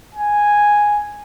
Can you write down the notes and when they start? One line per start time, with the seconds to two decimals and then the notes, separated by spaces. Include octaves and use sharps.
0.15 G#5